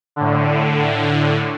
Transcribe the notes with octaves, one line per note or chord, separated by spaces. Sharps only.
A2 D3